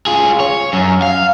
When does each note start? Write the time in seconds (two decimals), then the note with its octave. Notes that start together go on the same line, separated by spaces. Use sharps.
0.07 F4 G#4
0.40 C#5
0.73 F#2
1.02 F5